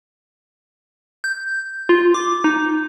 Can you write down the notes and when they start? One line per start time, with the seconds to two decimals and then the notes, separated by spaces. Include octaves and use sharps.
1.24 G6
1.89 F4
2.14 D6
2.44 D#4